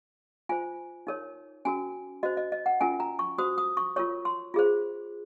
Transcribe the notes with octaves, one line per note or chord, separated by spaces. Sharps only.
F4 C5 G#5
D#4 A#4 C#5
C#4 F#4 A#4 G#5
F#4 C5 D#5
D#5
D#5
F#5
C#4 F4 A#4 G#5
A#5
C#6
F#4 C5 D#6
D#6
C#6
F4 A#4 C#5 C#6
C6
F4 G#4 C5